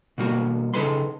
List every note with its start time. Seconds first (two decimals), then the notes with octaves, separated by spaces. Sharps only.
0.18 B2 G3 A#3 F#4
0.74 C#3 D#4 A4 B4 B5 C6